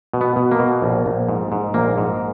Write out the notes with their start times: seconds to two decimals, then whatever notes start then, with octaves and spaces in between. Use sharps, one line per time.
0.14 B2
0.21 B3
0.36 B2
0.51 A#3
0.59 B2
0.82 A#1
1.06 A#1
1.29 G#2
1.52 G#2
1.74 A#1 A#3
1.98 G#2